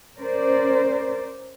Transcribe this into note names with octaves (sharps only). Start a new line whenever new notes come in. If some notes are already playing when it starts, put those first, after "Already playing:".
C#4 A#4 C5 D5